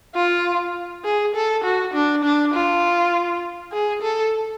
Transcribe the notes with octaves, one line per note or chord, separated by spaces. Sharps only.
F4
G#4
A4
F#4
D4
D4
F4
G#4
A4